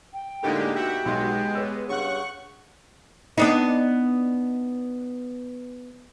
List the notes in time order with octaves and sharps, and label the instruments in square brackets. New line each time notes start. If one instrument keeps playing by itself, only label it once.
[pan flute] G5
[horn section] A2 D3 [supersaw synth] G#3 A#3 G4 [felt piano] D4 D#4 A#4
[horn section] B2 G4 G5 [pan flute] F#4 [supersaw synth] E5 F#5
[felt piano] B1 C6 [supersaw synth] G#3 B3
[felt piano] G#4 C#5 E6 [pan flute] B4
[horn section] G2 C#3 [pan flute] F#5 [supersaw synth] C#6 F#6
[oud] B3 D4 D#4